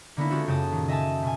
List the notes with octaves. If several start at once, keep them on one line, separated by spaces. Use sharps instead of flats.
D3 A#3 B3 C#4 D#4 E4
G#3 C4 C#4 F4 F#4 A4
F#2 C#3 G5 A5 D#6
A#2 D#3
D#5 E5 G#5 A5
B2 G#5